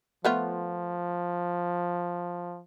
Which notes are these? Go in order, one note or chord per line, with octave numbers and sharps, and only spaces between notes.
F3 A3 B3 F4